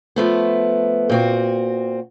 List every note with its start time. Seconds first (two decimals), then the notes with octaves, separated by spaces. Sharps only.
0.16 F3 A3 B3
1.10 A#2 C4 F#4